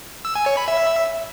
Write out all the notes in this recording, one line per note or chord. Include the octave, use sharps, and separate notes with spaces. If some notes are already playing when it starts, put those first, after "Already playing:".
E6
G#5
C#5
B5
E5